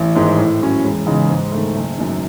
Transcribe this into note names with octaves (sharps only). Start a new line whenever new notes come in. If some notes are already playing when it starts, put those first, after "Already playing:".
Already playing: A1
G#2 D#3 G#3
A2
F#3 C#4
E1
E2 C#3 G#3 D#4
G#2
D#3 A3
F#1
F#2 D#3